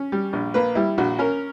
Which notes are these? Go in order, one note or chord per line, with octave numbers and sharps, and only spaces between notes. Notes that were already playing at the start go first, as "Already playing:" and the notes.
Already playing: C#4
G3
A#1
A#3 B4
G3 E4
A#1 F#4
C#4 A#4